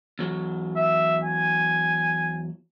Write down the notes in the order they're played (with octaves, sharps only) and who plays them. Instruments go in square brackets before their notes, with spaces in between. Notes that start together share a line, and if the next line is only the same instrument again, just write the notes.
[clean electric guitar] E2 F#3
[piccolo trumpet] E5
G#5